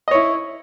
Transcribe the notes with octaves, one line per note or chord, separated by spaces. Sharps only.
E4 C#5 D#5